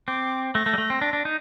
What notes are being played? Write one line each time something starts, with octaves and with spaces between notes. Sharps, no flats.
C4 D6
A3 A#6
A3
G3
A3
C4
D4
D4
D#4